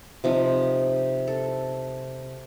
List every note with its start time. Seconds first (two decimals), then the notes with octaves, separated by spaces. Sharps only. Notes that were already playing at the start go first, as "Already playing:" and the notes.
0.24 C3 F3 D#4
1.28 A4